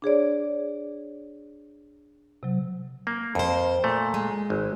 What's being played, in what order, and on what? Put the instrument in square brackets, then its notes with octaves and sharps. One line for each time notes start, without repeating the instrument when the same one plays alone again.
[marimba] D4 G#4 C#5 D5
C3 F#3
[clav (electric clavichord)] A#3
[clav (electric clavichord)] F2 [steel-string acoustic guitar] A#4 C5
[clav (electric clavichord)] A#2 A3
[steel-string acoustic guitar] G#3
[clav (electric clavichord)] G#1